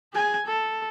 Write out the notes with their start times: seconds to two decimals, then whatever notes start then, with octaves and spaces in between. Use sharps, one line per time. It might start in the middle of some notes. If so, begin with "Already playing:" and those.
0.13 G#4 G#5
0.46 A4